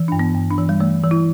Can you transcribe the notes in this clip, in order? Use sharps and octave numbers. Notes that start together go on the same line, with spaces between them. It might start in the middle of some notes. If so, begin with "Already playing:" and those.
Already playing: E3
G2 D4
B3
G2
D4
E3
G3
E3 A3
E3
E4